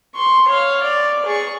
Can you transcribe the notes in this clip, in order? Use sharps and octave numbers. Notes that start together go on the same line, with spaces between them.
C6 C#6
C#5 F5
D5
G#4 C#6